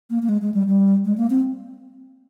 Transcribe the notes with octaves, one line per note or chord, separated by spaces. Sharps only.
A#3
A#3
G#3
G#3
G3
G3
G#3
A#3
C4